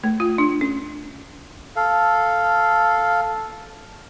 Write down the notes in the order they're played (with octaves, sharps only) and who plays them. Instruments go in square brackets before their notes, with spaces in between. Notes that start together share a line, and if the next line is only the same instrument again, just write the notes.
[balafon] A3
F4
D4
C#4
[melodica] A4 F5